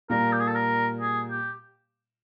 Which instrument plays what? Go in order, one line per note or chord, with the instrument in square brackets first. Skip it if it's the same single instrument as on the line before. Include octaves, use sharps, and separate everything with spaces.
[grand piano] A#2 G3 A#3 [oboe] A#4
[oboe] G4
G#4
A4
A#4
G#4
G4